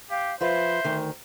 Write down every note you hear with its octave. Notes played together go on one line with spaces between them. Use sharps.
G4 F5
F3 F4 B4 C5 E5
D2 D#3